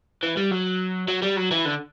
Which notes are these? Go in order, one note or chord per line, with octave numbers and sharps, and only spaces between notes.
E3
G3
F#3
F#3
G3
F#3
E3
D3